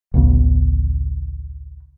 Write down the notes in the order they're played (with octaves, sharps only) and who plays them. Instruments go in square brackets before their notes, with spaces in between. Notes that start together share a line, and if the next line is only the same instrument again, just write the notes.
[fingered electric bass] A1 D2 C#3 B3